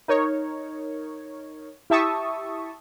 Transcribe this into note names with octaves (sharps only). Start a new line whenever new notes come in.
D#4 A#4 C#5
E4 G4 E5 A5 C#6 D#6